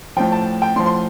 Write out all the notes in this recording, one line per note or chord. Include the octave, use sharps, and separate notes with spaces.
A2 F3 G5
A5
G5
A2 F3 C6
C6